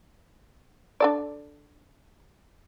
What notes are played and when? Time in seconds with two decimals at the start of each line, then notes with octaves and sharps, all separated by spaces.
1.00 D4 A4 D5